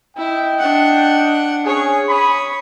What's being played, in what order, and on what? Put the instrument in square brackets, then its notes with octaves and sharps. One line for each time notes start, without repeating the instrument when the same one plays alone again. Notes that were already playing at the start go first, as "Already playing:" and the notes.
[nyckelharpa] E4 [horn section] D#5 G5
[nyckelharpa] D4 F#5
[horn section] C#4 G#4 [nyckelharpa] C#5
[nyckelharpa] C#5 D#6 [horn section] B5